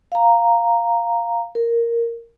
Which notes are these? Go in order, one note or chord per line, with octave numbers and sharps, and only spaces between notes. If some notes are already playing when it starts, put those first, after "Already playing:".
F5 A#5
A#4